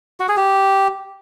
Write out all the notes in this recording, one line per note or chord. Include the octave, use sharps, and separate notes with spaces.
F#4
G#4
G4